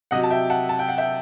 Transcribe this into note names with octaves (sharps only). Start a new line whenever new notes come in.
C3 F#3 D#5 F#5
A5
E5 G5
F#5 A5
A5
G5
F#5
E5 G5